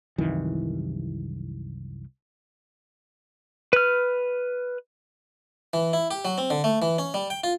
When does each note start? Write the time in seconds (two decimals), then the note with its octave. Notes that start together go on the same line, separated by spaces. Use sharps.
0.18 C2 F#2 D#3 E3
3.73 B4 F6
5.73 E3
5.93 E4
6.11 G4
6.25 F#3
6.38 C4
6.50 D3
6.64 A3
6.82 E3
6.98 C#4
7.14 G3
7.30 G5
7.44 F4